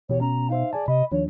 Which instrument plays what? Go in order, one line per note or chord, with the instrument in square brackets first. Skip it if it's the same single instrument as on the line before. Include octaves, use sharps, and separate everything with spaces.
[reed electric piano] D#2 E3 G4 [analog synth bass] B2 [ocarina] C#5
[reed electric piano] C#4 [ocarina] A#5
[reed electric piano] D#4 C5 E5 [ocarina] F5
[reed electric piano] G#4 G#5 A5 [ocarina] D5
[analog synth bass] C3 [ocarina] D#5 [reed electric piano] B5
[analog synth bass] D#2 [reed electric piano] D#3 F3 D4 [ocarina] C#5